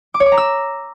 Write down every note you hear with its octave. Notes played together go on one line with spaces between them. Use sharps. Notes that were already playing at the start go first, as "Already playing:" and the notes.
D6
C#5
D6
A#5
E6